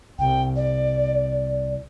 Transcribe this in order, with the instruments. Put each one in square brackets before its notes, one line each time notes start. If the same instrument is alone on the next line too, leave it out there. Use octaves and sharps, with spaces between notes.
[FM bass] C2 [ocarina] G5
[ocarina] D5